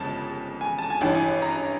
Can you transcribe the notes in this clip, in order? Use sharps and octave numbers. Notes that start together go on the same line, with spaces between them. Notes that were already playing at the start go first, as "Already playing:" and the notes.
Already playing: G1 F2 C#3 G#3 A5
G#5
A5
G#5
A1 G2 E3 G5
G#5
A#5